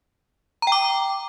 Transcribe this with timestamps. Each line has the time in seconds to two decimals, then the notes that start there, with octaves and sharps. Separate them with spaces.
0.62 A#5
0.67 G5
0.72 D6